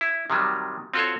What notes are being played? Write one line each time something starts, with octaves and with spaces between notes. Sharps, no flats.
E4
C3 D#3 F#3 G3
C4 F4 F#4 A4 C5 C#5